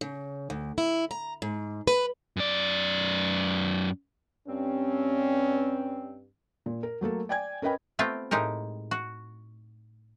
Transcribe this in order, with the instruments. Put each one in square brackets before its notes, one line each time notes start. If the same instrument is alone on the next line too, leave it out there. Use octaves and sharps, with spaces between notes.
[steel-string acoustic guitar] C#3
D2
E4
A#5
G#2
B4
[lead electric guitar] F#2 D5
[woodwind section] G2 C4 [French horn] C#4
[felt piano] A#2
A#4
F#3 A3 A#3 A4
D5 G5 G#5 G#6
C#4 A#4 B4 D#5 G5 B5
[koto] A3 B3 C4 F4 G4
A2 G#3 D#4 G4 A#4
F#4